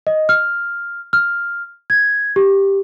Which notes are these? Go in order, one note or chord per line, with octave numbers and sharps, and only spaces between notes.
D#5
F6
F6
G#6
G4